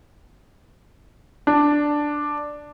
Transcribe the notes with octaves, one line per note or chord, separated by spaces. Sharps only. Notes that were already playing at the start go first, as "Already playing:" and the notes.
D4